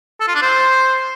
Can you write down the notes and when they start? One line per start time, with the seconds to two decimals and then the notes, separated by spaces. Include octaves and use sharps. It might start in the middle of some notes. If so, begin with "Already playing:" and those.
0.20 A4
0.28 F4
0.35 D4
0.42 C5